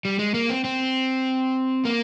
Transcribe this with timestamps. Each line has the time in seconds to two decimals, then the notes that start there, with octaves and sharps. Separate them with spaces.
0.05 G3
0.19 G#3
0.34 A#3
0.50 C4
0.65 C4
1.85 A#3